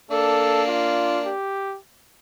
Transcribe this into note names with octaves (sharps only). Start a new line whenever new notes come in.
A#3 D4 A4
F4
G4